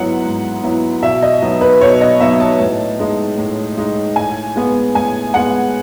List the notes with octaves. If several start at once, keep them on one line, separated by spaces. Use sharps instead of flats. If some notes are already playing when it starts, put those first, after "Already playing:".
Already playing: G#2 F#3 B3 E4 F#5
G#2
F#3 B3 E4
B2 E5
D#5
F#3 B3 D#4
B4
B2 C#5
D#5
F#3 B3 D#4 E5
A5
A2
G#3 D#4
A2
G#3 D#4
A2 G#5
G#3 B3
A2 G#5
G#3 B3 F#5